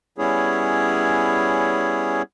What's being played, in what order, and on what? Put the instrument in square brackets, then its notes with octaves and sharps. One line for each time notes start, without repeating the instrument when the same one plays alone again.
[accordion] G3 B3 C#4 E4 G#4 C#5